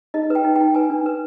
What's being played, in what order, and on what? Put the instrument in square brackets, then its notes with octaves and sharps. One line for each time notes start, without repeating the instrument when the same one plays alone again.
[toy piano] D#4 D#5
B4 G5
D#4
D#4 G5
B4 G#5
D4
B4